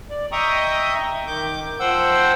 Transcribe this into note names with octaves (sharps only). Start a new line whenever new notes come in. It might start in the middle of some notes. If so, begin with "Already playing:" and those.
D5
D#5 E5 G5 A#5 C#6 D#6
D#3 D6 G6
F3 C5 F#5 G5 E6